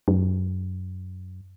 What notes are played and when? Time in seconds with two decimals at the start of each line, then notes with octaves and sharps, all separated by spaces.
0.08 F#2